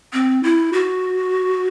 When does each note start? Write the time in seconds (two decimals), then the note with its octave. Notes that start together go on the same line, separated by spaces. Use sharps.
0.13 C4
0.43 E4
0.73 F#4